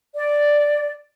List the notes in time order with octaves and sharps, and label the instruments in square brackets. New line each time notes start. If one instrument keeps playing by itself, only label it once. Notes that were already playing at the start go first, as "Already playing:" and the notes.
[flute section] D5